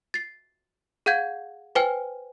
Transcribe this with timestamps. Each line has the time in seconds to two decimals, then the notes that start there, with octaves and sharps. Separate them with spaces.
0.14 A6 C7
1.06 G#4 F5 F#5 G6 G#6
1.75 B4 C5 G5 G#5 F6